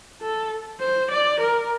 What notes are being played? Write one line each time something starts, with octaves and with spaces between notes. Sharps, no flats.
A4
C5
D5
A#4